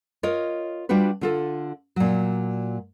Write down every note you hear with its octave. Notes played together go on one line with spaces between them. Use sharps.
F4 A#4 C#5 D#5
G3 D4 F4 F#4 B4
D3 F4 A4
A#2 F#3